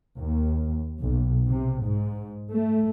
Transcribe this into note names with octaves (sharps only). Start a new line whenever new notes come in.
D#2
B1
C3
G#2
A3